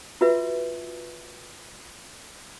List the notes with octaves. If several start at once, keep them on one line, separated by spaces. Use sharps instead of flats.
F4 F#4 B4 E5